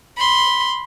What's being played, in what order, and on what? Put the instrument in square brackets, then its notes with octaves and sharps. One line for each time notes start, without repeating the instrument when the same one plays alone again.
[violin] B5 C6